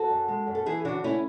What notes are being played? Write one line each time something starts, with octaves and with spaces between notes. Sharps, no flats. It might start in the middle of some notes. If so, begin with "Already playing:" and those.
Already playing: F#4 A4
F#2
G#3
F#2
A4
E3 E4 G#4
C#3 D4 F#4
A3 C#4 E4